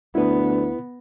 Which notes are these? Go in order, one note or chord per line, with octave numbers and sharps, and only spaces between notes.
D2 B3 E4 B4